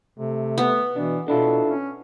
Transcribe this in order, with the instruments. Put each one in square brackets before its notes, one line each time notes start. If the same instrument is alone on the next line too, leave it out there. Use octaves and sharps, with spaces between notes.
[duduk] C3 [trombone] A3
[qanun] B3
[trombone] B2 [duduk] E3 [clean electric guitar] D4
[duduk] B2 [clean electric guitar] D4 E4 F4 [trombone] A4
[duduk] C#4